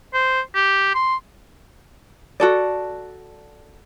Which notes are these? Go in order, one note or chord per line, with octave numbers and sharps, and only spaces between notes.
C5
G4
C6
F#4 A4 D5